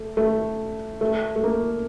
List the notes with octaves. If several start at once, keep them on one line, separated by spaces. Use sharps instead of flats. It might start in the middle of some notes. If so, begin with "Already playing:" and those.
Already playing: A3
A3
A3
A3
A#3